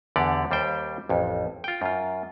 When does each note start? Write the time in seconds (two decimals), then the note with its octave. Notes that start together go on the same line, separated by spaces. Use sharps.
0.16 E2 D3 G4 D5 F#5
0.51 D#2 G3 C5 G5
1.09 A1 F2
1.64 F4 G5
1.82 F#2 F4